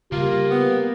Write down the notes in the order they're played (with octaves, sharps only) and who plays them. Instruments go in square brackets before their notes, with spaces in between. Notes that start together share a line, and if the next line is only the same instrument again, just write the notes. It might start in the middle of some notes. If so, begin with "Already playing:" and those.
[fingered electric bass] C#3 G3 [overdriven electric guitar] A#3 [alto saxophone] F4 [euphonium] G4
[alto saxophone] B3